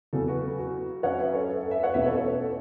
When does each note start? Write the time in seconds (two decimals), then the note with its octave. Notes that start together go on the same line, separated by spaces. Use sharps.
0.13 E2 C#3 F#3 A4
0.27 F#4 B4
0.42 A4
0.59 F#4
1.03 F#2 F#3 C#4 C#5 F#5
1.19 B4 E5
1.33 A4 C#5
1.49 A4
1.60 A4
1.71 B4 E5
1.83 C#5 F#5
1.94 E2 B2 A3 C#4 B4 E5
2.06 A4 C#5
2.17 A4 C#5
2.40 A4